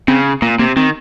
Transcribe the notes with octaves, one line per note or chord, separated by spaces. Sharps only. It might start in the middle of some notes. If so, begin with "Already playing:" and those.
C#3 C4
A#2 A#3
C3 A#3
D#3 C4